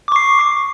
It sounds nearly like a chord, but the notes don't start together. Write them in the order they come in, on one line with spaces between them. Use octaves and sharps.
D6 C#6 C7